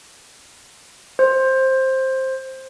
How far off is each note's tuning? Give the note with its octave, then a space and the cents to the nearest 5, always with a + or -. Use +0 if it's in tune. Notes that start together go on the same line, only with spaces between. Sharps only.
C5 +10